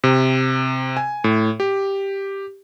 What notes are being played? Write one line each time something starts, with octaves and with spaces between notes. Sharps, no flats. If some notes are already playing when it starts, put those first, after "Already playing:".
C3
G#5
A2
G4